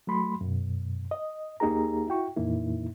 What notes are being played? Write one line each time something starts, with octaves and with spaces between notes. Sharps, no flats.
F#3 A3 B5 C6
F#2 B2
D#5
D#2 A#3 D#4 G4 G#4 A#5
E4 F#4 G5 C#6
F2 A#2 E3 A#3 D#4 E4